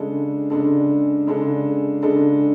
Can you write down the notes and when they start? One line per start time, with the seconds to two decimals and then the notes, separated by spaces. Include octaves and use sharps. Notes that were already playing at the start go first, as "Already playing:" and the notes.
Already playing: C#3 G#3 D4 A4
0.50 C#3 G#3 D4 A4
1.27 C#3 G#3 D4 A4
2.03 C#3 G#3 D4 A4